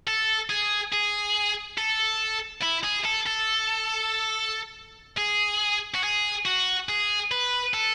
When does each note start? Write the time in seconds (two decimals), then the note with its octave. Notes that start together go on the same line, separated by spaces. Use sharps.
0.07 A4
0.50 G#4
0.92 G#4
1.78 A4
2.63 E4
2.84 G#4
3.05 A4
3.27 A4
5.18 G#4
5.94 F#4
6.04 G#4
6.46 F#4
6.89 G#4
7.31 B4
7.74 A4